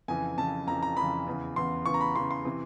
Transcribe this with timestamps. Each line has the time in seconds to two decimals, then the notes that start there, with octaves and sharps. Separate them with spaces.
0.08 F2 C#3 E3 G#5
0.37 F2 C#3 E3 A5
0.67 F2 C#3 E3 A#5
0.83 A#5
0.97 F2 C#3 E3 B5
1.27 E2 C#3 E3
1.56 E2 C#3 E3 C6
1.86 E2 C#3 E3 C#6
1.94 A#5
2.01 B5
2.15 E2 C#3 E3 C6
2.31 C6
2.45 C3 E3